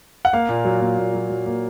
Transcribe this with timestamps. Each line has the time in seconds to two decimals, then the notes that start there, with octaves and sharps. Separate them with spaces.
0.25 F#5
0.33 A#3 F5
0.49 A#2
0.65 F#3
0.82 A#2
0.98 A#2
1.14 F#3
1.30 F#3
1.46 A#3